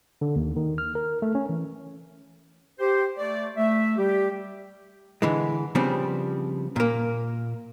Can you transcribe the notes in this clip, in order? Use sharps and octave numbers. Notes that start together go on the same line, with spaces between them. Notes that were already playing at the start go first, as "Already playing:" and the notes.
D3
D#2
D#3
F6
A#4
A3
C#4
E3
G4 C5
A3 D5
A3 E5
G3 G4
D3 E3 G#3
C#3 F3 G3 B3 C4 D4
A#2 A#3